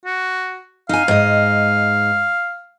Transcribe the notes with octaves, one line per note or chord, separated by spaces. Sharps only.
F#4
D#4 F5 G#5
G#2 D#5